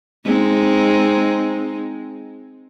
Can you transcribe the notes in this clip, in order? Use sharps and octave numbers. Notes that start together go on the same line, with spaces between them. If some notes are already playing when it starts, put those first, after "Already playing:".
G#3 C4 D#4